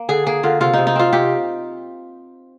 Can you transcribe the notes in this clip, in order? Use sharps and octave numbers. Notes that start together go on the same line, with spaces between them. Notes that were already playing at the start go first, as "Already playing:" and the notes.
Already playing: A#3
D3 G#4
A#3 G#4
D3 F4
C3 F4
C3 D#4
D#4
C4 F4
C3 G4